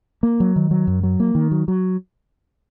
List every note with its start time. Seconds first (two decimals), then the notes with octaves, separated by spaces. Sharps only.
0.23 A#3
0.40 F#3
0.56 D#3
0.71 F#3
0.87 F#2
1.03 F#3
1.20 A#3
1.35 D#3
1.51 F#3
1.68 F#3